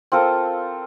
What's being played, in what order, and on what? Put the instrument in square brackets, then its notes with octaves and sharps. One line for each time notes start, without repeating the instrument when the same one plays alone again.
[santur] C4 F4 A4 A#4